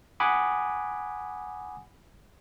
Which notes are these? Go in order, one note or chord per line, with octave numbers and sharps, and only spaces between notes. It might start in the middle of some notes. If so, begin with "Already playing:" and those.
F#5 G#5 B5 D6 D#6